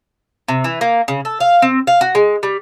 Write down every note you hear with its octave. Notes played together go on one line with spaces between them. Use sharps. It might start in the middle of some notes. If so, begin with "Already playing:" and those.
C3
E3
A#3
C#3
A4
F5
C4
F5
F#4
G#3
G3